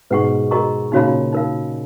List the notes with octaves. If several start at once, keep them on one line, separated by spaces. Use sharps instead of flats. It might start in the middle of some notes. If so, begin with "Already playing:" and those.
G#2 B2 B4 F#5 C#6
F#4 A#4 D#5 A#5 C#6
A#2 C#3 D#4 F#4 C#5 F5 B5
D#4 A#4 F5